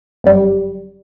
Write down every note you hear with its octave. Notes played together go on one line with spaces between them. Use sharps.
G1 F#2 G3